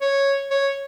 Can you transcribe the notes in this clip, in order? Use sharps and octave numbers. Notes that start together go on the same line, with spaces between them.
C#5
C#5